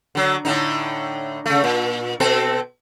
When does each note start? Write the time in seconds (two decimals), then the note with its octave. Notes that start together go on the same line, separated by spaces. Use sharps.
0.15 D3 F#3
0.45 A2 D3 D#4
1.46 C#3 A3
1.64 A#2
2.20 B2 C4 A4